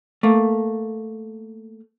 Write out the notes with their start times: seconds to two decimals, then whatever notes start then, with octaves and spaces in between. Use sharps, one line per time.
0.23 A3 A#3